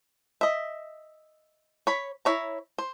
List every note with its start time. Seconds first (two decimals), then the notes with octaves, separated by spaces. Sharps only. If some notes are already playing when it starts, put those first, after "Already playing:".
0.41 D#5 E5
1.87 C#5 B5
2.25 E4 C#5 A#5
2.78 C5